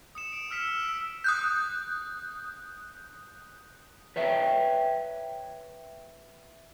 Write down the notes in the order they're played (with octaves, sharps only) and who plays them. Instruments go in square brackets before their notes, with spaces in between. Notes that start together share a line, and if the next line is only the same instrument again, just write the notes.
[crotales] D#6 C#7 E7
D7
E6 F6 B6 C#7 E7
E6
E6 B6
[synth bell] D#6 F#6 G6
[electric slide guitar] B4 C#5 E5 G5